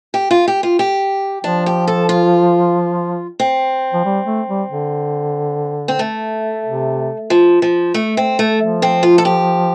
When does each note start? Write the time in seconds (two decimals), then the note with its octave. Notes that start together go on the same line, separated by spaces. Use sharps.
0.14 G4
0.31 F4
0.47 G4
0.63 F4
0.79 G4
1.44 F3 D4
1.66 G4
1.87 A4
2.09 F4
3.39 C4
3.93 F3
4.05 G3
4.27 A3
4.48 G3
4.70 D3
5.88 C4
5.99 A3
6.65 C3
7.30 F3
7.62 F3
7.94 A3
8.17 C4
8.39 A3
8.60 F3
8.82 C4
9.03 F4
9.18 A4
9.25 G4